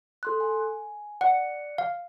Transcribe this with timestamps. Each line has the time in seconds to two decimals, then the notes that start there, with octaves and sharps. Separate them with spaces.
0.23 A4 C6 F#6
0.40 G#5
1.21 D5 F#5 F#6 C#7
1.78 F5